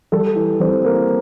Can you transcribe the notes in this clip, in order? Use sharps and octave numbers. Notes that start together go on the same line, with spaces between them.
G3 A4
E3
G3 C4
E3 A#3